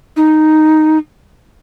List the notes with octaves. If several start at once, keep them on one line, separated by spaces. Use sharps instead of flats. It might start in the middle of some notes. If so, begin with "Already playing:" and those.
D#4